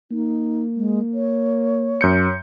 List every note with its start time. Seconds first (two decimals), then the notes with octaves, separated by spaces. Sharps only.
0.11 A#3 D#4
0.76 G#3
1.14 C#5
2.01 F#2 G6 C#7